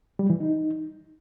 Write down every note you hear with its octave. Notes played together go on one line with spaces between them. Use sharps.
G3
E3
D#4